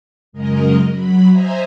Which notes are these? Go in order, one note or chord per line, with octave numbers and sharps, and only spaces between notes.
F#2 C#3 G#3 A#4 D#5
F#3 B5
C5 D#5 E5 G#5 A#5